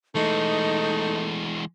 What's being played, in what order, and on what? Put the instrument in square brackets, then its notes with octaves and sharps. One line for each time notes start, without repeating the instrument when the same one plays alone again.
[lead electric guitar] E3 G#3 [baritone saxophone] A3 [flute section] D#4